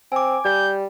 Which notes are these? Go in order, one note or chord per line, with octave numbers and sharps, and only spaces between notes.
C4 G#5 D6
G3 G6